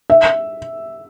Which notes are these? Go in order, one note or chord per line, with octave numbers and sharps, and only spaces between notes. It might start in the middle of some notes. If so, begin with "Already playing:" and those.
E5